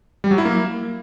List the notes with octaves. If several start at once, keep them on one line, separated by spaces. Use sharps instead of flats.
G3
F#3
E4
A#3